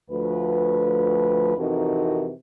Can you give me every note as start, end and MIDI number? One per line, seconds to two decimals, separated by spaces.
0.11 1.55 38
0.11 1.55 53
0.11 1.55 71
1.57 2.31 41
1.57 2.31 48
1.57 2.31 52
1.57 2.31 63
1.57 2.31 66
1.57 2.31 70